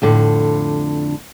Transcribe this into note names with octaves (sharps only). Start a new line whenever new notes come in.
F2 A2 D3